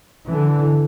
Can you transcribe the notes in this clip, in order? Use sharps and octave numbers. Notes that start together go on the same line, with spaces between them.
D3 E3